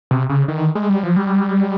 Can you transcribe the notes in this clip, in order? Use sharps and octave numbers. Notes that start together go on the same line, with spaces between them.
C3
C#3
D#3
G#3
G3
F3
G3